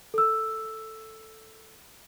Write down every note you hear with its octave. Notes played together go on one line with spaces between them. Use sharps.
A4 E6